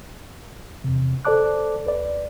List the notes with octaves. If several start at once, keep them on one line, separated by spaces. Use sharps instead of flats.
E2 C3
A4 C5 D5 A5 D6 F#6
D2 B4 D5